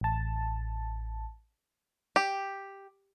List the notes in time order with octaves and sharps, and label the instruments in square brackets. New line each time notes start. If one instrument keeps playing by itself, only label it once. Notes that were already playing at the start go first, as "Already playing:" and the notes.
[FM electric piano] A1 A5
[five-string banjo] G4